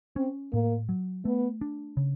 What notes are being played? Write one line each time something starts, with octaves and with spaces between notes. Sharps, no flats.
C4 C#4
A2 A#3
F#3
A3 B3
D4
C#3